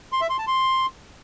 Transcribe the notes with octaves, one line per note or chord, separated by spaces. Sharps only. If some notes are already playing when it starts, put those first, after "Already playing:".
C6
E5
C6
A5
C6